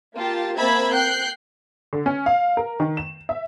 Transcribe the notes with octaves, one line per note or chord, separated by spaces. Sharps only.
A#3 F4 G4 A5
A#3 C4 E5 A5 B5 G#6
G5 F#6 G6 C7
D3
C#4
F5
A#4
D#3
E7
E5